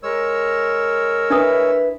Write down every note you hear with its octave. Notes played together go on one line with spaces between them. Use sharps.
G#3 A#4 C#5 E6
D4 E4 B4 A#5 D#6